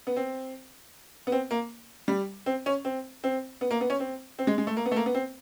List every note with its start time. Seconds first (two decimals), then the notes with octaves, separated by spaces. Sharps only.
0.07 B3
0.16 C4
1.27 B3
1.32 C4
1.51 A#3
2.08 G3
2.46 C4
2.66 C#4
2.85 C4
3.24 C4
3.61 B3
3.71 A#3
3.81 B3
3.90 C#4
4.00 C4
4.39 C4
4.47 G#3
4.58 G#3
4.67 A3
4.77 A#3
4.86 B3
4.91 A3
4.96 A#3
5.06 B3
5.15 C4